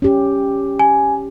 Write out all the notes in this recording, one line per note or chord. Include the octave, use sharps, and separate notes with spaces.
C#4 G4
G#5